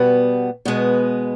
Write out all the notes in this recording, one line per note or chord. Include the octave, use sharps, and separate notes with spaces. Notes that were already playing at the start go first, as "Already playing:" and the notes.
Already playing: B2 G3 B3
B2 G#3 B3